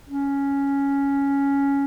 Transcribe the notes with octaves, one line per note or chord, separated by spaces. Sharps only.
C#4